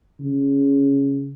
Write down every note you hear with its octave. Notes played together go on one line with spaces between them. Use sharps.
C#3